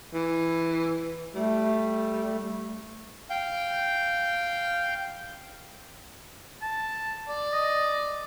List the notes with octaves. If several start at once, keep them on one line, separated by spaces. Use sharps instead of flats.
E3
G3 A3
F5 G5 G6
A5
D5
D#5